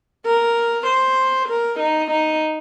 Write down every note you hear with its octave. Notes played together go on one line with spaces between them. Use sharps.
A#4
C5
A#4
D#4
D#4